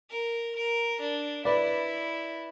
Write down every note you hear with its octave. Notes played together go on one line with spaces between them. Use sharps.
A#4
A#4
D4
E4 B4 D5